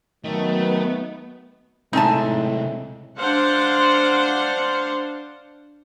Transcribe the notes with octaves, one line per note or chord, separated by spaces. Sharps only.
D#3 F#3 A3 B3
A2 C3 G#3 C4 D#4 E5 G#5 A5
D4 C5 F5 F#5